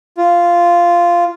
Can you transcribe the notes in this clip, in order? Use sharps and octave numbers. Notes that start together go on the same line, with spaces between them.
F4